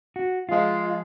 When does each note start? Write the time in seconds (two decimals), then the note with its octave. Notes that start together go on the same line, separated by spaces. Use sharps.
0.16 F#4
0.49 F3 G#3 F4